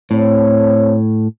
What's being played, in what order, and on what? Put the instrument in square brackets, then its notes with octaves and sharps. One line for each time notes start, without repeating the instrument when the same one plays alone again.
[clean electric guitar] A2 [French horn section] C4 C#5